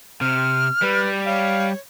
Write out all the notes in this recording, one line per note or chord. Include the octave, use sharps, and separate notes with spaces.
C3 F6
G3 B4
C#5 F5